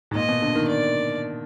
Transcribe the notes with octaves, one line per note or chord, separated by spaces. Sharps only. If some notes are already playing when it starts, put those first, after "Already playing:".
G#2
A#2 D#5
B2
D3
D#3
D5